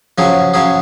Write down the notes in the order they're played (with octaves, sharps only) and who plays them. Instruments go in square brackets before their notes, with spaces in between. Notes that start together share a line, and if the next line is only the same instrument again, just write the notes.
[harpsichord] C#3 F#3 C#4 G#4 [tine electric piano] F3
[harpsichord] C#3 F#3 C#4 G#4